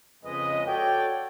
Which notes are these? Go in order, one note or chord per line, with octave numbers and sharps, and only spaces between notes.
F2 C#3 G#3 B4 D#5
F#4 A4 C#5 D5 G5